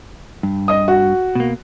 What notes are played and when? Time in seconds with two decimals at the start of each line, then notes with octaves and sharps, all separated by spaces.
0.43 G2
0.68 D#5 D#6
0.88 F#4
1.35 B2 A#3